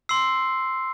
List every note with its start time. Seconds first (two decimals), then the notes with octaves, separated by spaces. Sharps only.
0.09 C6 E6 C7